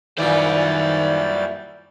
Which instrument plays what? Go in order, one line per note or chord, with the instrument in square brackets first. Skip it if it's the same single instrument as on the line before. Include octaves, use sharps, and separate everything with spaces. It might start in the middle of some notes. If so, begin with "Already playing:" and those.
[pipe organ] F#2 G3 A6 [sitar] A#2 E3 [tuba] D#3 [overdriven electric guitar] C5 D5